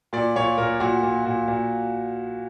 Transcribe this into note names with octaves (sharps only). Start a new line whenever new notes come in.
A#2 D5
A#2 C#5
A#2 A#4
A#2 F#4
A#2
A#2
A#2